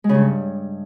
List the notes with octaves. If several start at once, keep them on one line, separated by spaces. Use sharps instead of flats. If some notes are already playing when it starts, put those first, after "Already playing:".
G#3
C#3
G2